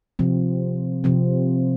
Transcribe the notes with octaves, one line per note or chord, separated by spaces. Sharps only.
C3 F3 C4
C3 F3 C4